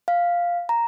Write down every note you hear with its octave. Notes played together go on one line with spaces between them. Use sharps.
F5
A#5